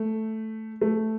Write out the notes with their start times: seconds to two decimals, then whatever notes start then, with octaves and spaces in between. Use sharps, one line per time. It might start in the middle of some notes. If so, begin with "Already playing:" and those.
Already playing: A3
0.81 A3